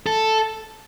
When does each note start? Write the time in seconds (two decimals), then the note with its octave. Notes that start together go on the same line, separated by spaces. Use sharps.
0.06 A4